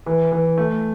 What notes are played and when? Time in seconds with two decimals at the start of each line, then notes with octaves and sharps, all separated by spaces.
0.06 E3
0.32 E3
0.58 A3